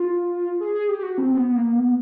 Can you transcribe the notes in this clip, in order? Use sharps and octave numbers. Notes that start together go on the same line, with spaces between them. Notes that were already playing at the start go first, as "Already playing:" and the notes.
Already playing: F4
G#4
G#4
G4
G4
F#4
C4
C4
B3
B3
A#3
B3